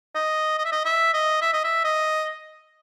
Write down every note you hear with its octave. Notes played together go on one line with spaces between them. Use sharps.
D#5
D#5
E5
D#5
E5
D#5
E5
D#5
E5
D#5